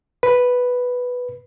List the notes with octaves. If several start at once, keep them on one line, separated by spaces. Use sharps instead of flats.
B4